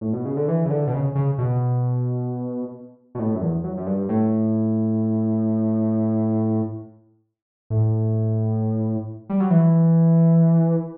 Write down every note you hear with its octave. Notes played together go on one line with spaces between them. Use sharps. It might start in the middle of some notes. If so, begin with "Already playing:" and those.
A2
B2
C#3
D3
E3
C#3
D3
B2
C#3
C#3
B2
B2
A2
F#2
E2
F#2
F#2
G2
A2
A2
G3
F#3
E3